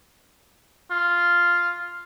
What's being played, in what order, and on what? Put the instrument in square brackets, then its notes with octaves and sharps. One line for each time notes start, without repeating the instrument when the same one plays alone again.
[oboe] F4